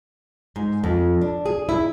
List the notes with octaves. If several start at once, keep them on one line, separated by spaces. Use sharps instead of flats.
G#2
F2
D4
G#4
E4